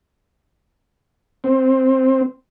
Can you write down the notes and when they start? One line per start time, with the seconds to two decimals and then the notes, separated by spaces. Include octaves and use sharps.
1.44 C4